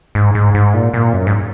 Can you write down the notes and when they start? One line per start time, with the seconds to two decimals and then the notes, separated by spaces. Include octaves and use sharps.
0.15 G#2
0.35 G#2
0.55 G#2
0.74 A#2
0.94 A#2
1.13 F#2
1.27 G#2